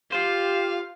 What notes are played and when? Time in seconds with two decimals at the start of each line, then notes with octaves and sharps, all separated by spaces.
0.12 F4 G4 C5 F5